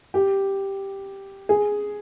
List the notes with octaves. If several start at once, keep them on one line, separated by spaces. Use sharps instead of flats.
G4
G#4